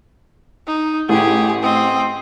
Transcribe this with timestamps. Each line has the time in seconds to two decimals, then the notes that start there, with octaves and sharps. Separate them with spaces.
0.67 D#4
1.09 A1 G4 G#4
1.62 C4 D#5